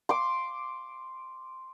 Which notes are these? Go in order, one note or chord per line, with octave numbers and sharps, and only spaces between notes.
C6 D6